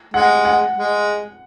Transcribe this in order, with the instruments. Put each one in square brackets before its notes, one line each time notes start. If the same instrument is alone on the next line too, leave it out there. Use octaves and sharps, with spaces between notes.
[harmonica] G#3 [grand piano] F#5
[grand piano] F#5
[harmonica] G#3